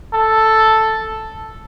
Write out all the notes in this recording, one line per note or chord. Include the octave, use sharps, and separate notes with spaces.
A4